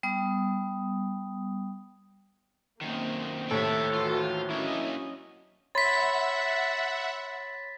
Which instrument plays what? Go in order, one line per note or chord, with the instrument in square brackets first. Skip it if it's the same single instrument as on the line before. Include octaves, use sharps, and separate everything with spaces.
[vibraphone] G3 B3 D#6
[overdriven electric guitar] F#2 D#3 [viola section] A#3 C4
[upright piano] D#2 A2 [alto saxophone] A4 [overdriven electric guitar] E5 G5
[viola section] E3 F#4 C5 [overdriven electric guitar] F4
[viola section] F#3 C#4 D#5 [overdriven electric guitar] A#3 D4 [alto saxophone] E4
[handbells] C#5 B5 C6 [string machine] E5 F#5 [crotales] A6 B6